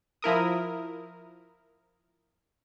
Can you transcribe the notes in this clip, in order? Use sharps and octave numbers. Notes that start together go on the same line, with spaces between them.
F3 E4 A#4 D#6